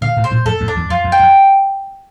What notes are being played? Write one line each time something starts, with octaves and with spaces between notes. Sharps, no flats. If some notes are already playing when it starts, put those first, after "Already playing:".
A#2 D3 F5
A2 C3
C5
G2 A#2
F2 A2 A4
F2 A2
D4
E2 G2
F2 F4
F2
G5
F2